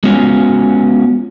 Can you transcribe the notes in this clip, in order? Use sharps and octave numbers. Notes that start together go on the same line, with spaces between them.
G#3 B3 C#4 F4 F#4